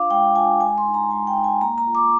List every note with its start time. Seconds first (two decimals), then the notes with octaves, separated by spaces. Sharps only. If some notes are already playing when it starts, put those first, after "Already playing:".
Already playing: D4 F4 F5 D6
0.10 G#3 G5
0.35 D4 F4 G#5
0.61 G#3 G#5
0.78 C6
0.86 D#4
0.94 A#5
1.11 G#3 G#5
1.27 G5
1.36 D#4
1.44 G#5
1.61 A#3 A#5
1.78 A#5
1.87 F4
1.95 D6